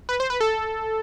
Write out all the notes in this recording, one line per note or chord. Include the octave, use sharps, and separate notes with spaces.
B4
C5
B4
A4